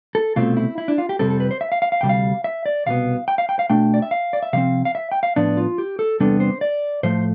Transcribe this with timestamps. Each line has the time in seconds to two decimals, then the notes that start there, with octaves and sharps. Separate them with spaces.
0.15 A4
0.36 C2 B2 A3 C4 F4
0.57 E4
0.78 E4
0.88 D4
0.98 F4
1.09 G4
1.19 F2 C3 G3 C4 A4
1.30 A4
1.40 B4
1.51 C5
1.61 E5
1.72 F5
1.82 F5
1.92 F5
2.01 D2 C3 G3 G5
2.09 F5
2.44 E5
2.66 D5
2.86 C2 B2 B3 F5
3.28 G5
3.38 F5
3.49 G5
3.59 F5
3.70 B2 A3 D4 G5
3.94 D5
4.02 E5
4.11 F5
4.33 D5
4.43 E5
4.53 C3 F3 C4 F5
4.85 F5
4.95 E5
5.12 G5
5.23 F5
5.36 A2 F3 B3 D4 D5
5.57 F4
5.78 G4
5.99 A4
6.20 E2 C3 G3 B3 D4 A4
6.40 C5
6.61 D5
7.03 A2 F3 A3 C5